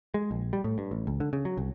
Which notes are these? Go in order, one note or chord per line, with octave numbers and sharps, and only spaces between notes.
G#3
A#1
G3
A2
G2
A1
C#2
D3
C#3
F#3
C2